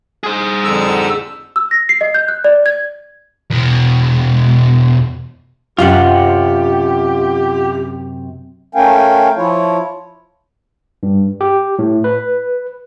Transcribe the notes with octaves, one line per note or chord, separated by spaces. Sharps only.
G#4 C5
F2 D3 E6
E6
A#6
C7
D#5
G6
F#6
D5
G#6
E2 B2
F#2 C3 C#4 F4 G4 F#5
A3 C#4 A#4 F5 G5 G#5
F3 E4 F4 C#5
G2
G4
A2
B4